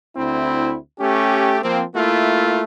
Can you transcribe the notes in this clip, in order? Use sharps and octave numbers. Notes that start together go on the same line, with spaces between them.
D2 C4 E4
A3 C#4 G4
F3 A#3 C4
A3 A#3 E4 F4